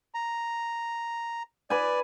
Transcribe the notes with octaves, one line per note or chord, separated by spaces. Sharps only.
A#5
B4 D5 G#5